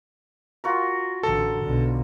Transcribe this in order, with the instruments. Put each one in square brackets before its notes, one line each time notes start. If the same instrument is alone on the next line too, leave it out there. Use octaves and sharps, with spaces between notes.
[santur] F4 F#4 A#4
[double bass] A1 D3 [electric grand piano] A4
[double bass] B1 D3